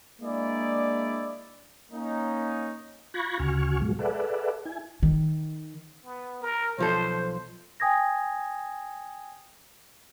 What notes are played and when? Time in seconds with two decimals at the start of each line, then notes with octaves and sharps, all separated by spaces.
0.21 G#3 A#3 D4 E4 G#4 D5
1.91 A#3 C#4 D#4
3.14 F4 B5 C#6 F#6 G#6 A#6
3.39 D2 C#3 F#4 G#5 C#6 F6
3.80 G#2 B2 F3 F#3 G#3
3.99 G#4 A4 B4 D5 E5 F#5
4.65 E4 G#5
5.03 D#3
6.04 B3
6.42 A#4
6.78 B1 F3 A4 C5
7.80 G5 G#5 D#6 G#6 A#6